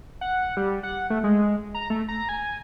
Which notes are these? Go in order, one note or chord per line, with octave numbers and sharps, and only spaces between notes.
F#5
G3
F#5
A3
G#3
A#5
A3
A#5
G#5